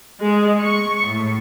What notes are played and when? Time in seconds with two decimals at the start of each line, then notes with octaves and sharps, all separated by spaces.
0.22 G#3
0.61 C#6
1.06 A2